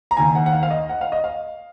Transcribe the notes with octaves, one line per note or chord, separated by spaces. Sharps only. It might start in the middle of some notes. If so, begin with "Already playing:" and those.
A#5
D#2 D#3 G#5
F#5
F#5
F5
F5
D#5
F#5
F5
D#5
F5